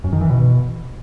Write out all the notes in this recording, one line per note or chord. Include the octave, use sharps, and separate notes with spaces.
F#2
D#3
E3
B2